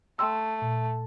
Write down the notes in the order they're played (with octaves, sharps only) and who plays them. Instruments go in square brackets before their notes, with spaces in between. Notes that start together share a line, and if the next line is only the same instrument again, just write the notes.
[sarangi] A3 [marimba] G5 C6 E6
[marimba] A#2